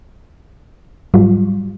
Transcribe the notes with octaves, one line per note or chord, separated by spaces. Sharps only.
G#2 F#3 G3 F4